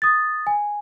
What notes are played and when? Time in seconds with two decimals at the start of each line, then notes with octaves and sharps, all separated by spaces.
0.02 D#6 A6
0.47 G#5